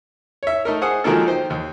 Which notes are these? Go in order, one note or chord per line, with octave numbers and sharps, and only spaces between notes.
C#5 E5
A3 D#4 A#4
G#4 C5 F#5 D#6
D#3 F3 F#3 G#3 A#3 A4
D#4 C5 G5
D#2